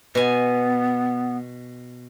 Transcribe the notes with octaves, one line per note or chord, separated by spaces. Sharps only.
B2 B3 G#5